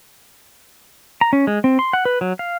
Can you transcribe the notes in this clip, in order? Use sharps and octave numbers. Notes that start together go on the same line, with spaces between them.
A#5
C#4
G#3
C4
C6
F#5
B4
F#3
F5